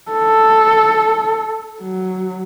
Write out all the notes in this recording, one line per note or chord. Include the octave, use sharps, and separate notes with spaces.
A4
F#3